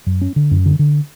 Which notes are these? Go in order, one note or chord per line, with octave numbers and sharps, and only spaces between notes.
F#2
C#4
D3
F#2
D3
D3